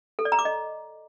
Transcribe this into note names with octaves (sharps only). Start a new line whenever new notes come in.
A4
D5
A#5
D6
D#5